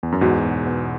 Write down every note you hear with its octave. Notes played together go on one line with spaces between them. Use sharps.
E2
F#2
E2 G#2 F#4
B2
B3